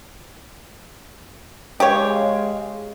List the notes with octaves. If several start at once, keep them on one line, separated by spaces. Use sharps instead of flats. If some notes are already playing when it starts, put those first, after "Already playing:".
G#3 G4 C#5 F5